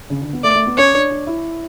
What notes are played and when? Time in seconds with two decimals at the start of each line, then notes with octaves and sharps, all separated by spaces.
0.10 C#3
0.21 D3
0.33 B3
0.44 A3 D5
0.55 A3
0.66 B3
0.77 C#4 C#5
0.94 D4
1.10 D4
1.27 E4